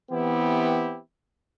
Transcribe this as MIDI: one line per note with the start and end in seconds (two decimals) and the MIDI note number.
0.11 0.99 52
0.11 0.99 59
0.11 0.99 60
0.11 0.99 64
0.11 0.99 67